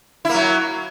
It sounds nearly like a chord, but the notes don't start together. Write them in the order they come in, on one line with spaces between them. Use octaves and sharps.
E4 A#3 F#3